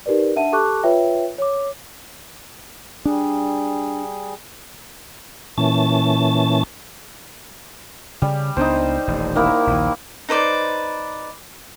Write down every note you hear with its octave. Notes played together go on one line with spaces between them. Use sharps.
D#4 G4 A#4 B4 D5
D4 E5 F#5 A5 D#7
G4 A4 A5 C#6 D6 F#6
F4 B4 C#5 E5 G5
C#5 D6
G3 D4 G#4
A#2 E3 C#4 A5
C#3 G3
C#2 B3 D4 D#4 C5
D#1 A1
D#3 A#3 E4
A#1 D#2
D#4 B4 C5 D5